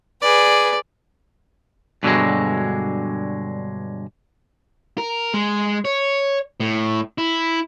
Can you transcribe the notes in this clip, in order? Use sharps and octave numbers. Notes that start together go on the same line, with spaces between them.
G#4 B4 D5
G2 B2 D3 D#3 F#3 G#3
A#4
G#3
C#5
A2
E4